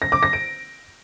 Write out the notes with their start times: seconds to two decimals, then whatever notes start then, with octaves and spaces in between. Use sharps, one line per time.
0.02 A#6
0.12 D6
0.23 A#6
0.33 D7